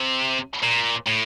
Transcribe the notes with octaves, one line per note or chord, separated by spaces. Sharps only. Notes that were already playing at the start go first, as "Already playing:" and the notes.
Already playing: C3
A#2
A2